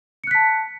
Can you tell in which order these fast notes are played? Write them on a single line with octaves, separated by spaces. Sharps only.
C#7 F#6 B6 A5